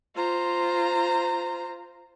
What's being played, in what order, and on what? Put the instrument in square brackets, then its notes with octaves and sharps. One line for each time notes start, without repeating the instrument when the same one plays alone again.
[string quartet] F4 C5 A#5